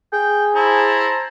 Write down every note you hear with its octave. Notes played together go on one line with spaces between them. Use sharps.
G#4 G5
E4 C5 A5 A#5